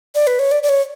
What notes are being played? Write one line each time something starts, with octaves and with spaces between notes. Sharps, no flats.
D5
B4
C#5
D5
D5
C#5